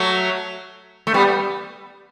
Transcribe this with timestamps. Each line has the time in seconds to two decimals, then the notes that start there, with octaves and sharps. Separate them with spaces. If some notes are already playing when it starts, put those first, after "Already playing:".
Already playing: F#3 A3
1.07 A3
1.14 G3 B3